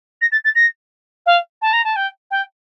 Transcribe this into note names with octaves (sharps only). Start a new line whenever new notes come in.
A#6
A6
A6
A#6
F5
A5
A#5
A5
G5
G5